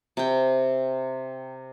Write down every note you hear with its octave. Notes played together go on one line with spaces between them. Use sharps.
C3 G5